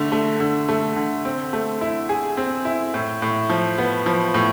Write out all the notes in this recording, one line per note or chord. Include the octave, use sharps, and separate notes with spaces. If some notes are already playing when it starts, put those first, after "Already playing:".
Already playing: D3 A3
A3
D3
A3
D3
C4
A3
E4
G#4
C4
E4
A2
A2
F3
B3
F3
A2